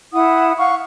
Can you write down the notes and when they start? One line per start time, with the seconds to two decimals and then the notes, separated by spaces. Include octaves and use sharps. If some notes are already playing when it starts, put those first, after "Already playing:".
0.14 E4 F#5 D#6
0.59 F5 F#5 C#6